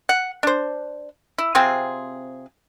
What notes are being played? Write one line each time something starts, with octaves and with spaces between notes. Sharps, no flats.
F#5
D4 C5
E4
C3 C4 F4 G#4